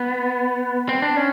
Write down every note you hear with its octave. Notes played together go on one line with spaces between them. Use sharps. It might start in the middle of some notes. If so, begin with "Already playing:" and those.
Already playing: B3
C4
D4
C#4